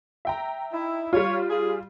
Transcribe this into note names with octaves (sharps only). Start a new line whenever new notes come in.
E5 G5 A#5
D#4 E4
G3 F4 C#5
G#4